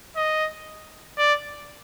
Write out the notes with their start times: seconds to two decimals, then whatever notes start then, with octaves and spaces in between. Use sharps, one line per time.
0.17 D#5
1.18 D5